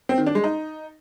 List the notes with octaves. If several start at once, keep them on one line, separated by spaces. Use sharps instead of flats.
C4
D#3
D4
G#3
D#4